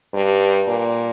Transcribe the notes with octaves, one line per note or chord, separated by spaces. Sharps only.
G2
A#2